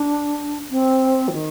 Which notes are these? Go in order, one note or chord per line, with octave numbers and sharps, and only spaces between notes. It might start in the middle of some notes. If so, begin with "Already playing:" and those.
Already playing: D4
C4
F3
D#3